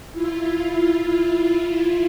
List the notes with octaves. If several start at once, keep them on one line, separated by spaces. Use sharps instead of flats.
E4 F4